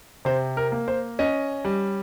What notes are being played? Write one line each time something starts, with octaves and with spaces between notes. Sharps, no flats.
C3 C5
A#4
A#3
C5
C#4 D#5
G3